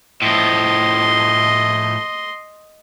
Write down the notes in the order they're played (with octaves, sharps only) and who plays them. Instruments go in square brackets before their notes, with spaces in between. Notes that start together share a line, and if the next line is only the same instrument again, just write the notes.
[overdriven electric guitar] A2 F3 [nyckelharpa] D#5 C6